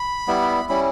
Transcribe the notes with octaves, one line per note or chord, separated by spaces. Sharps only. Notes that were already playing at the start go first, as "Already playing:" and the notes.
Already playing: B5
G3 B3 E4
G3 C#4 E4 B5